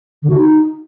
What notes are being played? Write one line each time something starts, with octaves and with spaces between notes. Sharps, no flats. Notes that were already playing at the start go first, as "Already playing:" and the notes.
D3
F#4
D#4